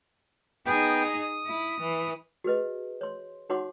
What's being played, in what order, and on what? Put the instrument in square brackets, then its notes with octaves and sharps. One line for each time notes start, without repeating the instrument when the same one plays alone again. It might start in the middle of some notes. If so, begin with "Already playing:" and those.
[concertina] B3 G5 [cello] D#4 G#4
[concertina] D#6
[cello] E4
E3
[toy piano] F#4 G#4 B4 D#5
C#5 C6
D#4 F#4 C#5 F#5 C6 D6